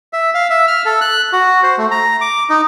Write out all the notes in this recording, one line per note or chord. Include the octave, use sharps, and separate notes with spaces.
E5
F5
E5
F6
A4
F#6
F#4
C5
A3
A#5
D6
D#4